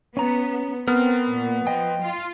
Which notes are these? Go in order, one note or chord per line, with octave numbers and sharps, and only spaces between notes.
B3 C#4 A#5
B3 C4 A#4 F6
A#2
F3 D#5 G5
F4